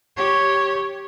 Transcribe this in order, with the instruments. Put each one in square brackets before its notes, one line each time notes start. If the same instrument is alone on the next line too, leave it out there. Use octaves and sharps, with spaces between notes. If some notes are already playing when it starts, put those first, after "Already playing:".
[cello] G4 C#5